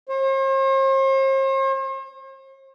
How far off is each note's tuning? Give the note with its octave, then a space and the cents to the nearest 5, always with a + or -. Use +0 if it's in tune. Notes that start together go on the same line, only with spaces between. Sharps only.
C5 +45